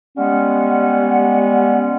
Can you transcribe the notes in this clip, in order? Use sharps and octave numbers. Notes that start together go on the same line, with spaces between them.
G3 G#3 B3 C#4 F#5